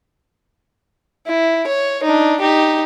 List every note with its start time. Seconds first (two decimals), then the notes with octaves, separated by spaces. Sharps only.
1.27 E4
1.67 C#5
2.03 D4 D#4
2.40 D#4 G4